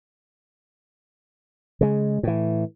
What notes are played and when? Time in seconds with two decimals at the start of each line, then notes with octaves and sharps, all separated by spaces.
1.81 C#3 G#3
2.23 A2 E3